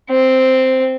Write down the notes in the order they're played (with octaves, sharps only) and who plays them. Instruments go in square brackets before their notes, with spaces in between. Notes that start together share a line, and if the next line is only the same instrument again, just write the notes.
[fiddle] C4